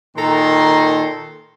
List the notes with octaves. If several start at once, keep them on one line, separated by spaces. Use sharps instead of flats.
A#2 D#3 A4 A#5 C6